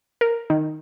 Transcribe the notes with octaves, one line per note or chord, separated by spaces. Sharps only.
A#4
D#3